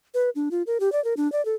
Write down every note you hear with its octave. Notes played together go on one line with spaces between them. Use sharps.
B4
D4
F4
A#4
G4
D5
A#4
D4
D5
A4